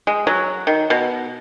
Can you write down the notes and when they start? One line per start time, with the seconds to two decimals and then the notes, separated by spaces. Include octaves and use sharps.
0.07 G#3
0.27 F#3
0.67 D#3
0.90 B2